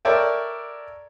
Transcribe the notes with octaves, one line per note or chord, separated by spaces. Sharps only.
A4 A#4 C#5 D5 E5 G5